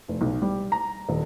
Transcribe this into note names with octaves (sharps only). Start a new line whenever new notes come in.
F1
B1
G3
A#5
D#1